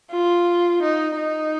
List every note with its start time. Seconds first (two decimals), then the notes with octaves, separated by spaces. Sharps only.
0.12 F4
0.83 D#4
1.17 D#4